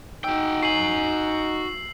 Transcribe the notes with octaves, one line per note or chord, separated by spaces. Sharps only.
D#4 F#4 G5 E6
F#4 G#5 C7 F#7